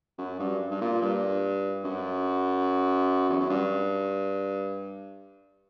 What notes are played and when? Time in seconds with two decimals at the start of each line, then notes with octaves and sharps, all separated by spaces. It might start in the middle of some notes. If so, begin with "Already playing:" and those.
0.18 F#2
0.39 G2
0.71 G2
0.81 A#2
1.01 G2
1.84 F#2
3.30 E2
3.40 F#2
3.49 G2